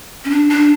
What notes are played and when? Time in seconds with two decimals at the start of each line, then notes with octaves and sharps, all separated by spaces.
0.25 C#4
0.30 D4
0.49 D4